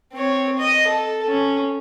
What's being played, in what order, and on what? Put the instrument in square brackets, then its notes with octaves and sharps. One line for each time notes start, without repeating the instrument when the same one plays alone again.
[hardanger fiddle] C4 C#5
D#5
A4
C#4